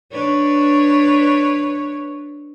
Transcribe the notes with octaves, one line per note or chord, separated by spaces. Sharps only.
D4 B4 C#5